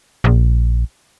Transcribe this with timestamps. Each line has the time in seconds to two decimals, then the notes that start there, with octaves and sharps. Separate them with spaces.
0.24 A#1